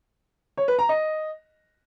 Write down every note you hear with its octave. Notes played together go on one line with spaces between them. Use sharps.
C#5
B4
A#5
D#5